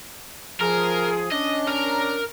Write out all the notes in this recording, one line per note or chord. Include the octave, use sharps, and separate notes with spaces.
F3 G#4 A#4
C#4 D4 D#5
A#4 A#5